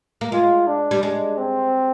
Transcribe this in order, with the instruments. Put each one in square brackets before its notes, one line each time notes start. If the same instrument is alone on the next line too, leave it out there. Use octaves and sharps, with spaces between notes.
[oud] A#3
[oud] G#3 [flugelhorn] F4
[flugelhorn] D4
[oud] G3
[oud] G#3 [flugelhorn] D4
[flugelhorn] C4